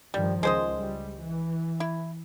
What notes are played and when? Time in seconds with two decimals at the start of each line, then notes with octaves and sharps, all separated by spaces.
0.14 G2 D#3 F3 G3
0.43 C#2 G#3 C5 D#5
0.78 G3
1.21 E3
1.80 E4